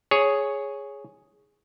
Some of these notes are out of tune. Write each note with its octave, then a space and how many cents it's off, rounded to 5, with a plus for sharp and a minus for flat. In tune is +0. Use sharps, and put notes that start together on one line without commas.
G#4 +0 C#5 +0